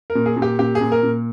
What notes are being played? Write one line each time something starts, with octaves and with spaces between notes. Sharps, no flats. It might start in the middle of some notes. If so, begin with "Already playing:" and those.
A#4
A#2
G#4
A#2
G4
A#2 G4
G#4
A#2
A#4
A#2